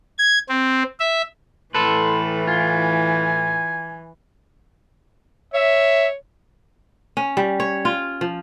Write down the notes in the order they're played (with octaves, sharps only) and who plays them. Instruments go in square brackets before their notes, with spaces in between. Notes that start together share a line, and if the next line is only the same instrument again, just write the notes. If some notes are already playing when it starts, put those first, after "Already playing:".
[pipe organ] G#6
C4
E5
[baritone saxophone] A2 [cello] E3 [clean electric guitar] A4 B4 [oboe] C6
[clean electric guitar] F4 [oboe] G#5
[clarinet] C#5 [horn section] E5
[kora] C#4
G3
C#5
F4
F3